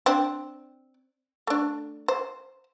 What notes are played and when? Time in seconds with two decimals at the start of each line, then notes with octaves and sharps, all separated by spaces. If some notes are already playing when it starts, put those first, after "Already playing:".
0.06 C4 D4
1.47 A3 D4
2.08 C5